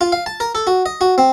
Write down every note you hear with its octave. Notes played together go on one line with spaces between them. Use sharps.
F4
F5
A5
A#4
A4
F#4
D#5
F#4
C4